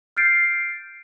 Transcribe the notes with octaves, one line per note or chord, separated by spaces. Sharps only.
F6 G6 A6 C7 D7